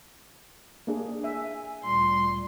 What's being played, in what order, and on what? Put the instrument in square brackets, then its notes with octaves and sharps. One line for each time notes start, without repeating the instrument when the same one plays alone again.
[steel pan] A#3 D4 G#4
[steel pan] E5 [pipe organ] G#5
[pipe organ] D2 A#2 G3 [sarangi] C6